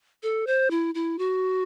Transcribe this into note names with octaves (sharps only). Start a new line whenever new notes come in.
A4
C5
E4
E4
F#4